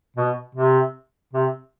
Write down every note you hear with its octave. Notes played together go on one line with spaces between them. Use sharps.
B2
C3
C3